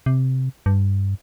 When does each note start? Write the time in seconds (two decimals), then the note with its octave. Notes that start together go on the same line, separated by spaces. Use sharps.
0.06 C3
0.66 G2